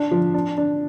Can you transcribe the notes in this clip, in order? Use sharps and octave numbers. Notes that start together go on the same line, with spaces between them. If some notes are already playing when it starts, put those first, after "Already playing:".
Already playing: D4
F3
D4
D4